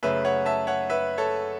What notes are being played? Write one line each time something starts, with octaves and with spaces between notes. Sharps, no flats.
F#2 C#3 A3 C#4 B4 E5
C#5 F#5
E5 A5
C#5 F#5
B4 E5
A4 C#5